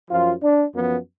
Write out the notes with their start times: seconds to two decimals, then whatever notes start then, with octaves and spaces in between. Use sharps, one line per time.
0.10 F#2 F3 F4
0.43 D4
0.74 F#2 F3 B3